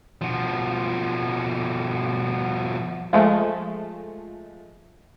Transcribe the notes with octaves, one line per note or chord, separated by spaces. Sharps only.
B2 F3
F3 G#3 A3